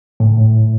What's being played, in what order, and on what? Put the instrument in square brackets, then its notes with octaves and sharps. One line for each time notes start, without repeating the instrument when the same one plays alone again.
[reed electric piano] A2